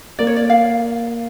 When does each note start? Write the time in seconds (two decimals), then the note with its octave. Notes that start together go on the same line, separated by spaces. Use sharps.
0.19 A#3 D5
0.27 C#5
0.36 D5
0.50 F5